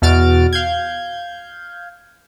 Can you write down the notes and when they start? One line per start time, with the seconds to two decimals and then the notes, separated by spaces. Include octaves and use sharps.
0.02 E2 B2 F#4 F6 A6 D7
0.53 F5 G6 G#6